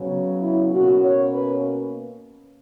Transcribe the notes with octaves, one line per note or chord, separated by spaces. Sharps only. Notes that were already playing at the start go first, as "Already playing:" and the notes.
Already playing: C#3 F#3 B3
E4
B2 A#3 C#4 F#4
C#5
B4